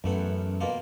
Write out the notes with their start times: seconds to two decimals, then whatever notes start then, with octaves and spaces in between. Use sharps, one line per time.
0.04 A1 F#2 A3 B3
0.61 B2 A#3 F4